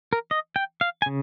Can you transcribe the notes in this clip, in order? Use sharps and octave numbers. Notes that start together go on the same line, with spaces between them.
A#4
D#5
G5
F5
G#5
C#3